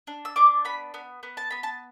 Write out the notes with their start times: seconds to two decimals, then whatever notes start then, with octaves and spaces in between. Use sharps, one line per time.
0.07 D4
0.25 E6
0.36 D4 D6
0.65 B3 B5
0.94 B3
1.23 B3
1.37 A5
1.51 B3 B5
1.63 A5